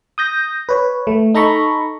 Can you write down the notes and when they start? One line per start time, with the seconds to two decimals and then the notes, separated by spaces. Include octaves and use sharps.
0.18 D#6 G6 A#6
0.69 B4 C#5
1.07 A3
1.35 D#4 A4 A#5 B5 C#6